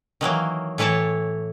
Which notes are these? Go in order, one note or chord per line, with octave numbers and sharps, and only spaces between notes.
D#3 E3 F#3 A#3
A2 E3 E4 C#5 A5